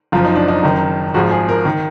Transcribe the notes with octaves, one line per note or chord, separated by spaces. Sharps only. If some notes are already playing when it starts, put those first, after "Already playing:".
F#1 F#2 F3 F4
D#4
D4
D#4
F#1 F#2 D#3
G#1 G#2 F3 F#4
G#4
A#4
D#3